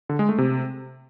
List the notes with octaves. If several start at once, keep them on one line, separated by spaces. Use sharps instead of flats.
D3
G#3
A3
C3